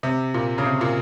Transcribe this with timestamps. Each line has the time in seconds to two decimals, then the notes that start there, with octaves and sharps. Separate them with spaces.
0.03 C3
0.34 A#2
0.58 C#3
0.65 C3
0.81 A#2